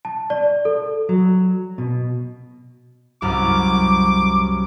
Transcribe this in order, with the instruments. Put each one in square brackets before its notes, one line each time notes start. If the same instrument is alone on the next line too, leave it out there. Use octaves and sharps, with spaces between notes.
[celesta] A5
D5
A4
[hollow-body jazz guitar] F#3
B2
[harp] C2 F#2 F6 [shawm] D6